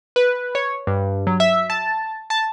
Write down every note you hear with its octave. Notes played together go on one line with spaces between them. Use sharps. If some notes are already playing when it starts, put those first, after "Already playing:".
B4
C#5
G2
F#3
E5
A5
A5